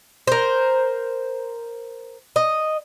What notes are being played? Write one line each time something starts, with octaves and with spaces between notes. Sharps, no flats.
A#4 C5
D#5